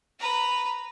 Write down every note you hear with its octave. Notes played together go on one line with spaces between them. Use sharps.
B4 A#5